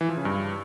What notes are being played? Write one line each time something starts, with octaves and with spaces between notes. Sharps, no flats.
E3
F3
C#3
G2